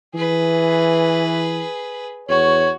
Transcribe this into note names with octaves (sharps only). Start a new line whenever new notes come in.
E3 G#4 B4
E2 F#4 C#5